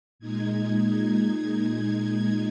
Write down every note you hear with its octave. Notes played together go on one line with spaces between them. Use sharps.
A#2 G#3 D#4 G#6
G#6